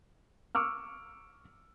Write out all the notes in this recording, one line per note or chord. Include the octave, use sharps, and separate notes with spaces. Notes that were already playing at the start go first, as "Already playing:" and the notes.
C#6 D6 E6 F6